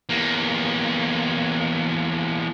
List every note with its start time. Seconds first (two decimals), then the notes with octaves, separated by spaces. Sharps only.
0.09 E2 A#3